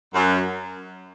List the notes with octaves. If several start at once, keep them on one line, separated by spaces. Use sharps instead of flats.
F#2